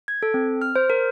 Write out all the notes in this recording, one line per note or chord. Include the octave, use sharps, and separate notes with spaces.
G#6
A4
C4
F6
C5
A#4